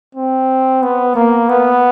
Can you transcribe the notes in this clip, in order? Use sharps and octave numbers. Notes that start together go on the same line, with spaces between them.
C4
B3
A#3
B3